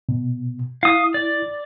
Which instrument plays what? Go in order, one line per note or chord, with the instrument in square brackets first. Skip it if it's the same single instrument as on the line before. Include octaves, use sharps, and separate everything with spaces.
[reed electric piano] B2
[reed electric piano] E4 [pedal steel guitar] F5 D#6
[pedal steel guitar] D5